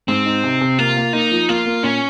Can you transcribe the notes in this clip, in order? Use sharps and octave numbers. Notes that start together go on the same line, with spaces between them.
G#2 C4
D#4
C3
C3
A#3 F4
A#3
A#3 D#4
F3
A#3 F4
A#3
A#2 C#4